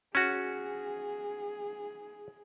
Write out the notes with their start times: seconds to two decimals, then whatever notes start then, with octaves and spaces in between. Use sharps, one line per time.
0.15 C#4 F#4 G#4